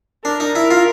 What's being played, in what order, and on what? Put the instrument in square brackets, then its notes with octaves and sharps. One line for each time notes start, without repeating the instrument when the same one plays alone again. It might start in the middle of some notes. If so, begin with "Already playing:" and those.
[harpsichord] D4 [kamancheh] A#4
[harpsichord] D#4
E4
F4